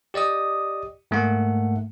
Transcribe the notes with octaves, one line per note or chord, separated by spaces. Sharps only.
G4 D5 D#5 D#6
G#2 A3 A#3 F#5